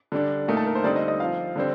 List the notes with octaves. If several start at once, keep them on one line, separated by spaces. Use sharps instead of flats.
D3 G3 D4
A#2 A3 D#4 A#4
A4
A#4
C5
D3 G3 C4 D#4 D5
D#5
D#5
F3 C4 F4 F5
D3 G3 C4